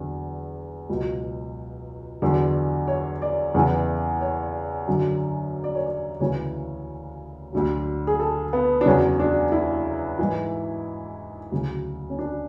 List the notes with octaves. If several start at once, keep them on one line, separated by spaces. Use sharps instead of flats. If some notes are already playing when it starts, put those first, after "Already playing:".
Already playing: E2 D3 F#3
C#2 B2 F#3
E2 D3 F#3
C#5
D5
E2 C#3 E3
C#5
F#2 D3 F#3
D5
C#5
D5
D2 C#3 E3 C#5
D2 D3 F#3
G#4
A4
B3
D4
E2 C#3 F#3 C#4
D4
E4
G#2 E3
D2 C#3 F#3
C#4
D4